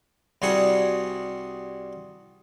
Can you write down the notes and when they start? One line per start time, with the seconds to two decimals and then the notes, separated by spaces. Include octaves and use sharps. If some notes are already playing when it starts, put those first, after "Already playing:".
0.42 C2 G3 F#4 G#4 C#6 D#6